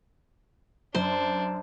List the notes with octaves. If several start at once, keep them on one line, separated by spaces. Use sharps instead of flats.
F#2 D4 C5